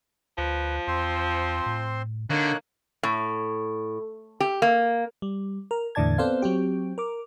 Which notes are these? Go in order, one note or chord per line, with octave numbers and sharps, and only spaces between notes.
D2 F3 B4
E2 C4 C5 C6
A2
D3 A#3 D#4 C#5 F#6
A2
G4
A#3
G3
A#4
E2 A2 D3 D5 A5 G#6
B3 C4 A4 C5 D5 F5
F#3 C4 G4
A#4 D6